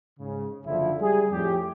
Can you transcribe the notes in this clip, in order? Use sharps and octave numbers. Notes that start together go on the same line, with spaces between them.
G#2 C#3
F#1 D3 F3 E4
G3 G#4
F2 A2 G4